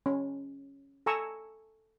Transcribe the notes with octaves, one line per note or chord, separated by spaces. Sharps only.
C#4
A4 G#5 A#5 C#6 E6